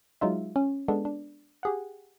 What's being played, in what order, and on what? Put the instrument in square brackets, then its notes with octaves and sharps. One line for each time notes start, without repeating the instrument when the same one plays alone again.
[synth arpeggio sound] F#3 G#3 D#4 F4 E5
C#4
G#3 B3 D4 A4
D4
G4 G#4 F#5